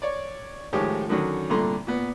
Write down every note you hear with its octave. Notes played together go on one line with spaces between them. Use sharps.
C#5 D5
A2 D#3 F3 G#3 G4 C#5
D3 D#3 F#3 C#4
C2 A#2 D3 A3 A#5 C6
A#2 B3